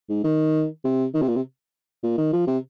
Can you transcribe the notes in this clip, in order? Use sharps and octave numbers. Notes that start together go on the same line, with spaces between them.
G#2
D#3
C3
D#3
C3
A#2
C3
A#2
D#3
F3
C3